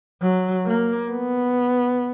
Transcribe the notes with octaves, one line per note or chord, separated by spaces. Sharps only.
F#3
A#3
B3